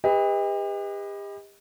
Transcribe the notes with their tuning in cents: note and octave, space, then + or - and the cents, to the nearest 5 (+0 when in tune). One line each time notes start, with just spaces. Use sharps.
G4 +40 B4 +0 D#5 +20